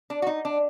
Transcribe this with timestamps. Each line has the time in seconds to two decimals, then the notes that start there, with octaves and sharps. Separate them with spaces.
0.10 D4
0.22 F#4
0.27 D#4
0.45 D4